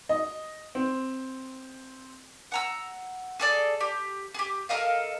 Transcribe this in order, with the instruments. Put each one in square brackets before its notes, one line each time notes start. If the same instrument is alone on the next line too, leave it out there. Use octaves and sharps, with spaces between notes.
[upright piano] D#5
C4
[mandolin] F#5 A#5 E6
G#4 A4 D5
G4
G4 G#4
A4 A#4 D#5 F5